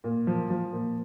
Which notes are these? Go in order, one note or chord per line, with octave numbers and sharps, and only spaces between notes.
A#2
F3
F3
A#2